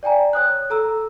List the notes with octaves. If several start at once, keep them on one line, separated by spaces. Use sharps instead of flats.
D5 G5 G#5 A#5
C#5 D#6 F#6
A4 A#5 E6